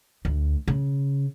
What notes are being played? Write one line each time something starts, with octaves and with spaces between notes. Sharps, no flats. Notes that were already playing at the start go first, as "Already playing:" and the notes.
D2
C#3